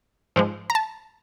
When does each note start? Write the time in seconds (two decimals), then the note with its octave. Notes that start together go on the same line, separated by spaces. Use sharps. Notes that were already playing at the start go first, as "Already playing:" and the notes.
0.36 G#2 F3 G#3
0.70 A#5
0.75 A5